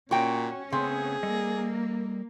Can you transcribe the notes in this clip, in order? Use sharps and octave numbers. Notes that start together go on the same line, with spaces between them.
A#2 C#4 F#4 G5
C#3 A3 B3 C4 G#4
G3 A#3 A4 D#5